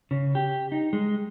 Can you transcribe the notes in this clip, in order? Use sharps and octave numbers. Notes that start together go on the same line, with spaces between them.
C#3
G4
D#4
G#3